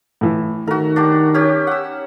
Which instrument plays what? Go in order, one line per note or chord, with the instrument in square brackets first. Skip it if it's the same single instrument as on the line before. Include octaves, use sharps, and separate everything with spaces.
[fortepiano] A2 E3
[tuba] D#3 [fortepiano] A3 [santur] F#4 A#4
[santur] D4 F#4 G4
C#4 G4
F#5 E6